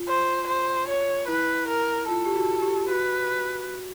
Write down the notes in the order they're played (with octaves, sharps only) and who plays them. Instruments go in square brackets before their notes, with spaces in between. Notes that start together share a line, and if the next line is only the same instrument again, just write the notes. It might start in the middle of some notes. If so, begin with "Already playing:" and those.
Already playing: [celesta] F4
[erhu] C5
C5
C#5
[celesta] E4 [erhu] B4
[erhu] A#4
[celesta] F4 [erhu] A4
[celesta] G4
F#4
G4
[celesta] F#4 [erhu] B4